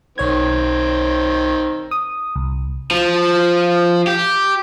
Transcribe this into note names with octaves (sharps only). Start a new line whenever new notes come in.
B1 D#3 C4 C#5 G#6
D#6
C2
F3
G4